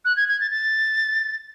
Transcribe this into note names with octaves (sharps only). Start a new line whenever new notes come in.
F#6
G#6
G#6
A6
A6